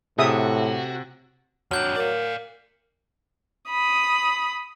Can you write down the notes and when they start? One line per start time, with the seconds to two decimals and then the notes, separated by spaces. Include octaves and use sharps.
0.19 A2 C3 F#4 G#4 E5 D#6
1.71 F2 F#3 D4 F6 G6 F#7
1.96 A#4 D5 F5
3.69 B5 D#6